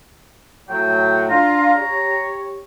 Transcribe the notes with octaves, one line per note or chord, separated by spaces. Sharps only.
A2 F#3 G5
D4 F4 A#5
G4 C#5